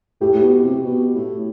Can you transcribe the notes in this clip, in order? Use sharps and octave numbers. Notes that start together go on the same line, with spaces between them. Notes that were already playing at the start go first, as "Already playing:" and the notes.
A2 G4
A2
B2
C3
B2
A2